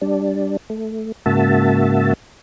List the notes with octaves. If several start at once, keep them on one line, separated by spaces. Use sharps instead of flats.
G3 D4
A3
G#2 C#3 A#3 F#4 E5 A5